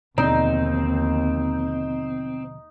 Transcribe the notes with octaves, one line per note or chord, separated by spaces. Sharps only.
D#2 B2 D3 F3 C4 D#4